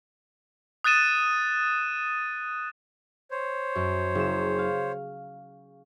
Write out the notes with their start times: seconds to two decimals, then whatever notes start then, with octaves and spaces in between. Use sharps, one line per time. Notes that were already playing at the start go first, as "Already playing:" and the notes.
0.84 D#6 F#6 A6 D#7 E7
3.31 C5 C#5
3.75 F#2
4.15 F#1 E7
4.58 F5